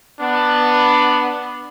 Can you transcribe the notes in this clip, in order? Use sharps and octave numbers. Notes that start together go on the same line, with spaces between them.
B3 D4